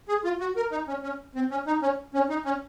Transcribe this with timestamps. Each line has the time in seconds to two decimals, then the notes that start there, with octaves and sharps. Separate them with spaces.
0.08 G#4
0.24 F4
0.40 F#4
0.56 A#4
0.71 D#4
0.88 C#4
1.03 C#4
1.35 C4
1.51 C#4
1.67 D#4
1.82 C#4
2.14 C#4
2.29 D#4
2.45 C#4